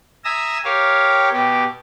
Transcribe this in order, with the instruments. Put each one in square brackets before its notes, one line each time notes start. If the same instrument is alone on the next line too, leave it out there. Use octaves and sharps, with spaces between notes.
[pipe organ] E5 G#5 A#5 D#6 E6
G4 A#4 C#5 F5
B2 G4